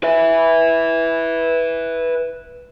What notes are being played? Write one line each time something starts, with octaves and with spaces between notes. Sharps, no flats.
B4 E5